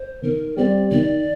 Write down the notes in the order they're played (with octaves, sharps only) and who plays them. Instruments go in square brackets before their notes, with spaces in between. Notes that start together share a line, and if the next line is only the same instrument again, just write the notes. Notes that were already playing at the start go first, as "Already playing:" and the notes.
Already playing: [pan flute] C5
[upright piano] D#3 [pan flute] A#4
[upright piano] G3 C4 G4 [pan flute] D5
[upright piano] D#3 [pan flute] D5